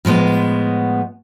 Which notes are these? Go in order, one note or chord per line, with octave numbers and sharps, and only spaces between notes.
A2 F3 G#3 B3